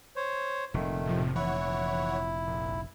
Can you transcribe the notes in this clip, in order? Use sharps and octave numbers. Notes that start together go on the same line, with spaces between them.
C5 C#5
F1 A#2 D#3 A3
A2 C3 F3
E3 E4 C#5 F#5
A#1